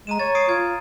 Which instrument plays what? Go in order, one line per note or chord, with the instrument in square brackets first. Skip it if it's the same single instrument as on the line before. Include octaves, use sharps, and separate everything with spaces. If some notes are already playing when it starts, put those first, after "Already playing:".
[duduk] G#3 [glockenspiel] A#5 D#7 E7
[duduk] C#5 [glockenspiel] A6
[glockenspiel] D#6 C7 D7
[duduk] F4 [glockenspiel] G#6